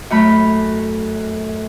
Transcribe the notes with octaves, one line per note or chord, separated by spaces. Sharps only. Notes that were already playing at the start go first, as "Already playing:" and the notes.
F#2 A3 B5